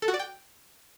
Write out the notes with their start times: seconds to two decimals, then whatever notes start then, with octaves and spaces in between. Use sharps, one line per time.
0.02 A4
0.08 F#4
0.14 D5
0.19 G5